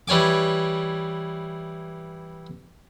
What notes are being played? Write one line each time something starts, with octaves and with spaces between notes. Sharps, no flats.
E3 G3 C#5 G#5 D6